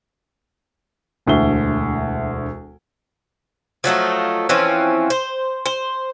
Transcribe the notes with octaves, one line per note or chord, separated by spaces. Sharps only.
E1 D2 E5 G7
F3 F#3 A3 D#4
E3 F3 C4 C#4
C5
C5